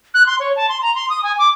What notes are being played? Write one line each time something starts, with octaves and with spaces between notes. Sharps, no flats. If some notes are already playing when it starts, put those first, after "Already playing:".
F#6
C6
C#5
A5
C6
A#5
C6
D#6
G#5
D6